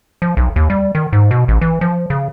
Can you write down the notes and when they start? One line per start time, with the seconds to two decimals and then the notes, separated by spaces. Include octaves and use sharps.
0.22 F3
0.37 B1
0.56 D#2
0.70 G3
0.95 D#3
1.13 G#2
1.31 B2
1.48 A1
1.61 E3
1.81 F3
2.10 C#3